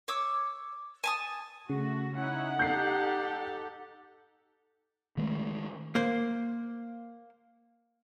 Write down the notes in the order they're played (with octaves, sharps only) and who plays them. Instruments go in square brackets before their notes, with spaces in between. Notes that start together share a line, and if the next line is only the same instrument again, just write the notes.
[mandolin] C#5 D6 E6
G#5 A5 D#6
[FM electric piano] C#3 [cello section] A3 F#4
[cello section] C#4 E4 [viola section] D#4 F#5
[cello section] G4 A4 [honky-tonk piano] G6 C7
[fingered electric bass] D#3 G#3 A3
[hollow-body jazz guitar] A#3 C5